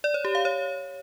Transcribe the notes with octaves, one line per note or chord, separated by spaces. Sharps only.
D5
C#5
G4
F5
C#5